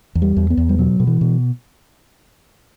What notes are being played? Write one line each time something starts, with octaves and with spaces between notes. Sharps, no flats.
E2
G3
E2
B3
E2
G3
B2 F#3
B2
E3
B2